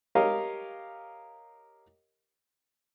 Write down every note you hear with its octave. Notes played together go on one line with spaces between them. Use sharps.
G4 A#4 C#5 D#5 F5